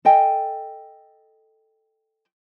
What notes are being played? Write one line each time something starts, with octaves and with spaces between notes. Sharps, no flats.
A4 D#5 G5 G#5